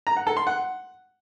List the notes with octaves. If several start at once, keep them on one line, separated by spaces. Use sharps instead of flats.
A#5
F#5
A4
C6
F#5